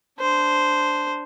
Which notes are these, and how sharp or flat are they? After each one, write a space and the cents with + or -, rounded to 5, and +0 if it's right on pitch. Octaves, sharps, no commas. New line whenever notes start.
D4 +0 C5 -10